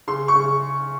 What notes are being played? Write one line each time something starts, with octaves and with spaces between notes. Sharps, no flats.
C#3 C6
C#6
C#3